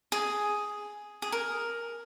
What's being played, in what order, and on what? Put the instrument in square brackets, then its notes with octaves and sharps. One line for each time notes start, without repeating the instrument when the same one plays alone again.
[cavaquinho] G#4
G#4
A#4